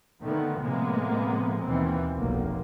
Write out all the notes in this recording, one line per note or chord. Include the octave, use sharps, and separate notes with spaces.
D3 D#3 A3 B3
A2 C3 F3 G#3 A#3 B3
D#2 B2 E3 C4
F1 B1 A#3